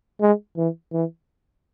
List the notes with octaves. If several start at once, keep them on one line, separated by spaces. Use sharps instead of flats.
G#3
E3
E3